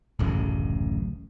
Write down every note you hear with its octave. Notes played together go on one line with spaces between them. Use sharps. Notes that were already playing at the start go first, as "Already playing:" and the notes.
D1 A1 F#2 C#3